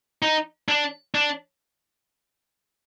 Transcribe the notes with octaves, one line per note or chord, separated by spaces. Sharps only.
D#4
D4
D4